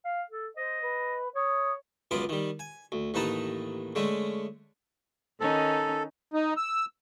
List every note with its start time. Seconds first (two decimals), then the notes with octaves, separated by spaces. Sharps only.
0.05 F5
0.30 A4
0.57 C5 D#5
0.82 B4
1.35 C#5 D#6
2.11 C#2 F#2 B3 F4 D5 D6
2.29 D#3 G3
2.59 G#5
2.92 D2
3.14 A1 D#2 D#4 B4 A5 A#5
3.95 D3 G#3 A3 C#4
5.40 D#3 C#4 D#4 A4
6.34 D#4
6.57 E6